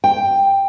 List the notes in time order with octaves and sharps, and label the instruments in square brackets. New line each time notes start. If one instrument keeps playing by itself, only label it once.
[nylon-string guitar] G5